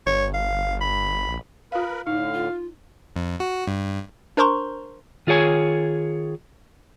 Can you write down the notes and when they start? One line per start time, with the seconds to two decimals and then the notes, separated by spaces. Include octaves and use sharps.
0.06 G1 C#5
0.34 F5
0.81 B5
1.27 A#1
1.72 F4 A#4 B4 F5 B5
2.07 A2 D3 D#4 F5
2.34 F4
3.16 F2
3.40 F#4
3.67 G2
4.37 D4 A#4 C5 A#5 C6 C#6
5.27 D#3 F4 G#4 C#5 G#5